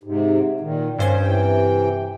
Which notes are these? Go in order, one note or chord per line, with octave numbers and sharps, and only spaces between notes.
G#2 C3
A#2 D#3
G2 C#4 C5 G#6
C3 E3 G5